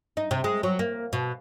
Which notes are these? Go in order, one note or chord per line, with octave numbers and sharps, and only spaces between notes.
D#4
C3
G#3
F#3
A#3
B2